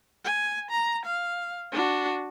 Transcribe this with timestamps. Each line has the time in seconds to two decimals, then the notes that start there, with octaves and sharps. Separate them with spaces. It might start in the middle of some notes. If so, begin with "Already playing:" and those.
0.24 G#5
0.71 A#5
1.06 F5
1.72 D4 F#4